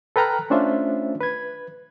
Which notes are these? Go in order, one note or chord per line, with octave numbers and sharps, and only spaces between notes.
A4 B4 G5 A#5 F6 F#6
A3 C#4 D4 F4 C5 E5
B4 G#6